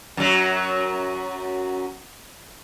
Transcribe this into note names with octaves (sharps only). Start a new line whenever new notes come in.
F#2 F#3